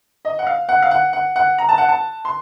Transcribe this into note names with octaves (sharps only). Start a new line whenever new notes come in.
D#5
F#5
F5
F#5
F5
F#5
F#5
F#5
A#5
A5
F#5
A5
C6